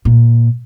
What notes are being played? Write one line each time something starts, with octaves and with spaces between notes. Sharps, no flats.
A#2